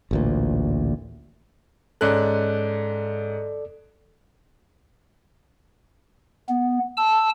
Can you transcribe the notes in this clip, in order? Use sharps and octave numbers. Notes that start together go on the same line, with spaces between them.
A1 D2 A#2
G#2 C#4 A4 D5 F#6
B3
A5 E6